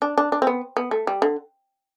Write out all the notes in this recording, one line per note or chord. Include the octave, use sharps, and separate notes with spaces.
D4
D4
D4
C4
B3
B3
A3
G3
D3